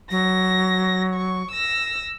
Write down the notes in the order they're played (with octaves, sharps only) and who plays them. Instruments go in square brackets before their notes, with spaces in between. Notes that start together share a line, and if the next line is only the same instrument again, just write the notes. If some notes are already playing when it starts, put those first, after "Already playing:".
[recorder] F#3 [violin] A#6
[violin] C#6
E6 A#6